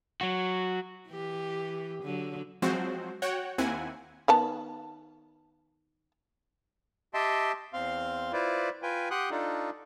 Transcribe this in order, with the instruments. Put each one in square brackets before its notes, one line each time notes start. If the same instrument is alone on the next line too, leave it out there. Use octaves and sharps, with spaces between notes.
[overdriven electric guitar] F#3 F#4
[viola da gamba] E3 G4
D3 F#3
[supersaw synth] F3 F#3 G#3 C4 F#4 C5
F#4 C#5 F#5 G5
D#2 A#3 C4 E4 F#5 G#5
[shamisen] D#3 B3 A5
[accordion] G4 D#5 E5 G5 A5 C6
E2 C4 F5 C6
E4 F4 B4 C5 D5
F4 B4 G5 G#5
G4 F#5 G5 C6 D#6 F#6
D4 D#4 F4 A4